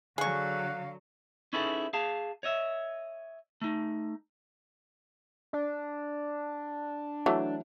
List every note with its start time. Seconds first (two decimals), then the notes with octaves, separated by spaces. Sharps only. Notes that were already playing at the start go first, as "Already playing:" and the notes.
0.18 D3 F#3 G#4 F5 F#5 C#6
1.53 C#4 D#4 E4 G#4 A4 B4
1.93 G#4 F5 A5
2.43 C#5 D#5 E5
3.62 A3 D#4
5.53 D4
7.26 E3 F#3 A3